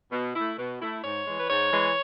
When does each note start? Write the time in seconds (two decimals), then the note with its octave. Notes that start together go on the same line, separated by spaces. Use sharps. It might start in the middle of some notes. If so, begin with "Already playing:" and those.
0.12 B2
0.35 A3 E4
0.58 B2
0.81 A3 E4
1.04 G#2 C#5
1.27 E3 G#3
1.40 B4
1.49 G#2 C#5
1.72 E3 G#3